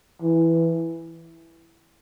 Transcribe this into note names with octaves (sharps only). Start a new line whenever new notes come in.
E3